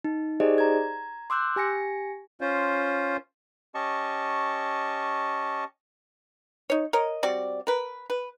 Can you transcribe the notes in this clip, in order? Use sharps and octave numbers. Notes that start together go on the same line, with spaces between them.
D#4
D#4 G4 G#4 C5 D5 D#5
A#5 G#6
C6 D6 E6 F#6 G6
G4 G#5 A#6 C#7
C#4 F4 C5
C#4 G4 D#5 A5 C#6
D#4 C#5
A#4 C#5 D#5
G3 C4 F#4 D5
A#4 B4
B4